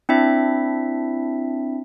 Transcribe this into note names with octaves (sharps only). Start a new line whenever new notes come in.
C4 D4 E4 E5